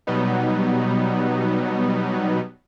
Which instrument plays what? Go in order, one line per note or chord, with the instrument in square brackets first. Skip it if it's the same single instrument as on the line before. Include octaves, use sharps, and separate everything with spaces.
[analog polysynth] B2 F#3 G3 B3 D#4